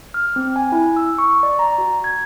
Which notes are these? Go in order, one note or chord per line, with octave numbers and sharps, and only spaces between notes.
F6
C4
G#5
E4
E6
C#6
D5
A#5
F#4
G#6